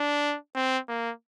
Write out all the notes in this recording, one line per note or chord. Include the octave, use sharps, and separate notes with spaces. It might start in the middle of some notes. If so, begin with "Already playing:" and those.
Already playing: D4
C4
A#3